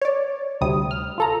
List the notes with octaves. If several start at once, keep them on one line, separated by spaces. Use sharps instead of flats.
C#5 D5
D2 C3 G3 D#6
F6
F4 A4 A#5